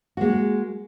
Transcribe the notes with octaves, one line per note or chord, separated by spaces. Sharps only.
G#3 A#3 F#4